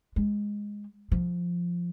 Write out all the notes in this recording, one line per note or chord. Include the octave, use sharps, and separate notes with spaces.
G#3
F3